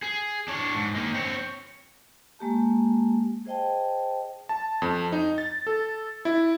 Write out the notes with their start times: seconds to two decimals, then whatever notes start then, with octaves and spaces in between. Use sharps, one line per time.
0.02 G#4
0.48 D4 C#5
0.75 G#2
0.95 A#3 D#4
1.15 C4 C#5
2.39 G#3 A#3 G4 A5
3.45 G#4 C5 D#5 G5 A5
4.49 A5
4.82 F2
5.12 D#4
5.38 A6
5.67 A4
6.25 E4